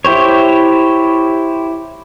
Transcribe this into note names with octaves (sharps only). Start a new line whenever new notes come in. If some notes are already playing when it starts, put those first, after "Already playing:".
E4 G4 C5 C#5